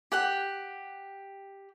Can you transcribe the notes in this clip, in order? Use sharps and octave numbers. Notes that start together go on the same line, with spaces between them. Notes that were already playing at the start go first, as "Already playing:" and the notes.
G4 F#5 G5